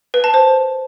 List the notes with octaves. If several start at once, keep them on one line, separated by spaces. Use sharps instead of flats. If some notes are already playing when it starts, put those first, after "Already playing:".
B4
A5
C5